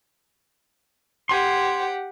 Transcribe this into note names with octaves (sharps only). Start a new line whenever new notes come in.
G4 C5 F#5 G#5 C6